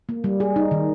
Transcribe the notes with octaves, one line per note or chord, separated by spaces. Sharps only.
A#3
G3
G#4
D#4
D#3